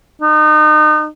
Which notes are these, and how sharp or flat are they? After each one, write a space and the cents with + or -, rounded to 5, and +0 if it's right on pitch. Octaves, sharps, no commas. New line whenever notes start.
D#4 -35